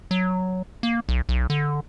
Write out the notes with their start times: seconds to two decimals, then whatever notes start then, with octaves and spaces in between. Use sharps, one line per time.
0.11 F#3
0.83 A#3
1.09 B1
1.29 B1
1.50 D3